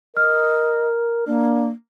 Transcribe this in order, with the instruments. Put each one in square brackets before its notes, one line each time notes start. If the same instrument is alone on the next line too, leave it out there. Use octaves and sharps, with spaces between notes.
[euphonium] A#4 [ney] D#5 [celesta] F6
[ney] A#3 [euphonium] D4